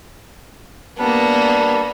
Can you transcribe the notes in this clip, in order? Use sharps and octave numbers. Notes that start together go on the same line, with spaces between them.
G3 A#3 B3 D4